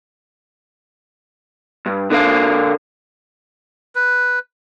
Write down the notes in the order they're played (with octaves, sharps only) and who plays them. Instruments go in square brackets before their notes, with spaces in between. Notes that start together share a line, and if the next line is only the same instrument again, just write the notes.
[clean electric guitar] G2
D3 D4 A#4 F5
[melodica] B4